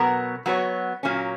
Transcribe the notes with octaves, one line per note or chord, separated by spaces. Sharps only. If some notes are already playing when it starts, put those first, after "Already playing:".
Already playing: B2 F#3 B3 F#4 A#4
F#3 B3 F#4 C#5
A#2 F#3 A#3 C#4